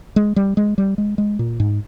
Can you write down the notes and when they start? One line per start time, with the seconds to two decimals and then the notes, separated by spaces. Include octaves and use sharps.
0.16 G#3
0.36 G3
0.57 G#3
0.78 G3
0.98 G#3
1.18 G#3
1.39 A#2
1.60 G#2